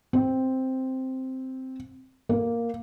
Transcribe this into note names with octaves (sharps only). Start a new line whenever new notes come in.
C4
A#3